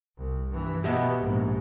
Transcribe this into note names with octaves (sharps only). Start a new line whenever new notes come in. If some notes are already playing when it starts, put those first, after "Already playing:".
C2
G2 E3
B2 B3 G4 D#5 E5
A#1 G#2